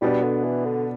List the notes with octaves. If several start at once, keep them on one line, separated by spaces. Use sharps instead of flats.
B2 G3 B3 D4
D3
E3
D3